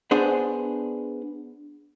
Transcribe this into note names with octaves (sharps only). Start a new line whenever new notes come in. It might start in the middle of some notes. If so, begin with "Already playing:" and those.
B3 D4 G#4 C5